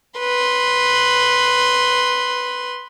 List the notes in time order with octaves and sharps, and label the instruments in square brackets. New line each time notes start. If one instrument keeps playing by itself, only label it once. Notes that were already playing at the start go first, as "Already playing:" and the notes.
[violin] B4 C6